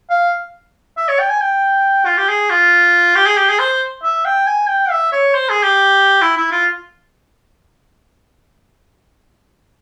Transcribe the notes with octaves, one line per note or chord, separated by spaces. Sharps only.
F5
E5
C#5
G5
G#5
G5
F4
G4
G#4
F4
G4
G#4
G4
G#4
C5
E5
G5
G#5
G5
E5
C#5
C5
G#4
G4
E4
E4
F4